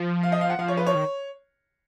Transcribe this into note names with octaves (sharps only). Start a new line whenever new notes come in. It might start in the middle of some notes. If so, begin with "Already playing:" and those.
Already playing: F3
F5
D#5
F5
F#5
F3 F5
C#5
B4
C#5
D#3